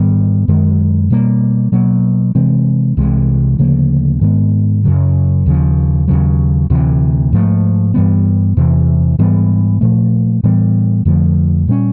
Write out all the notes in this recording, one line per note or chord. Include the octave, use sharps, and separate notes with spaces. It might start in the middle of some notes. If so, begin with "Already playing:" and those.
Already playing: G#2 D#3 G3 B3
F#2 D#3 G#3
B2 G3 A#3
B2 F#3 A#3
C3 E3 G#3 C4
C2 C3 E3 G#3
D2 C#3 F3 A#3
G#2 D#3 G#3 B3
F#2 C#3 F#3
D#2 C#3 F3
D#2 C#3 F#3
D2 C3 E3
G#2 F3 A3
G2 E3 G3 B3
E2 C3 E3
G#2 E3 G3 B3
A#2 F3 A3
A2 E3 G3 B3
F2 D3 F3 A3
A#2 G3 A#3 C#4